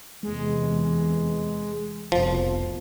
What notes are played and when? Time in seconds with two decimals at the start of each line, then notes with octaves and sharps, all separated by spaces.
0.23 E2 C3 E3 G#3
2.12 F1 C2 F2 B2 F3